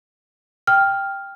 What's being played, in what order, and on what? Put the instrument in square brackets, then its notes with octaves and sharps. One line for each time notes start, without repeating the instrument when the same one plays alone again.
[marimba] G5 [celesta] F6